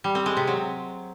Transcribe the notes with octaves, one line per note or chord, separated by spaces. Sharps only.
G3
C4
G#3
C3
F#3